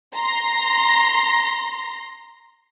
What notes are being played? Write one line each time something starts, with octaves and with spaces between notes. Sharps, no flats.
A#5 C6 A#6